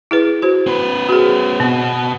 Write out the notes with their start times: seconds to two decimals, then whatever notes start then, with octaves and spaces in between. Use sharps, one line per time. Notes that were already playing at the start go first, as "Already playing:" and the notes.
0.11 E4 G#4 B4
0.42 F#4 C5
0.67 C4 B4
1.09 F#4 G#4
1.60 B2 B3